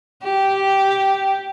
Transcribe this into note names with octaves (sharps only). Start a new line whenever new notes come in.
G4